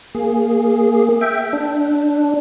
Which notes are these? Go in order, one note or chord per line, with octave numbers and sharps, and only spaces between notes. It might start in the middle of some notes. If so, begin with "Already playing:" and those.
A#3 G#4
E5 G5
D4